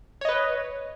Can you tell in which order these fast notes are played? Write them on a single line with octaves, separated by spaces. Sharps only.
C#5 D#5 B4